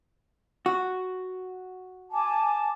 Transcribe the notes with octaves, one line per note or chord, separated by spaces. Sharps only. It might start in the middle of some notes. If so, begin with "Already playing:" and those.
F#4
G#5 A5 D6